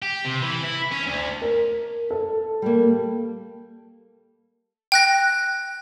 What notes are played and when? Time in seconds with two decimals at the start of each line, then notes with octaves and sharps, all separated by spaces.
0.02 G4
0.25 C3
0.42 E3
0.64 E4
0.92 C#4
1.06 D2
1.42 A#4
2.11 A4
2.62 G3 A#3
4.92 G5 F#6 A#6